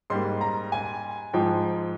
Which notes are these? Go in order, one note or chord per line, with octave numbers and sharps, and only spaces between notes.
G#2 G3 A#3 C6
A#5
G#5
G#2 F3 G#3 G5